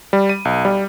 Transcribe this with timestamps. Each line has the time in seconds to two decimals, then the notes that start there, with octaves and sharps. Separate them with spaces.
0.13 G3
0.29 D#7
0.45 B1
0.65 G3